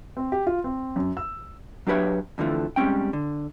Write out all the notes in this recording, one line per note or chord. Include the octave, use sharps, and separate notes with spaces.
C4
G4
F4
C4
F#2
E6
F#3 D4 G4 B4 C#5 E5
F2 D3 E3 F3 A3
G#2 G3 C4 C#4 G5
D3